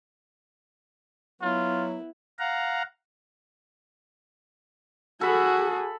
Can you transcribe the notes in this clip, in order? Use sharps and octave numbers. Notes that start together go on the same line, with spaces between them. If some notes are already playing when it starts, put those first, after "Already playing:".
F#3 B3 E4 F4
F5 F#5 A#5
F#4 G#4 A4 B5